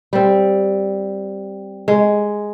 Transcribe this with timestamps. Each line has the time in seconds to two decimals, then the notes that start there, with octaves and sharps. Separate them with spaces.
0.13 G3 C4
1.88 G#3